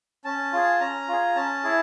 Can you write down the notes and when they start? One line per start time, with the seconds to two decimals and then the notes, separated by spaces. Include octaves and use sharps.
0.25 C#4 A5
0.53 F4 G#4
0.80 C#4 A#5
1.08 F4 G#4
1.36 C#4 A5
1.64 E4 G#4